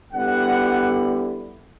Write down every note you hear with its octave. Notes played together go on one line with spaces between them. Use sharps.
D3 G3 B3 E4 F#5